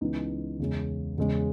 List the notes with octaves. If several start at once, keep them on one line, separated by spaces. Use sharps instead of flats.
C#2 C#3 E3 B3 D#4
E2 C#3 G#3 C#4
E2 C#3 G#3 C#4